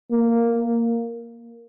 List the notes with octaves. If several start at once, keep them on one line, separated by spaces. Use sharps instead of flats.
A#3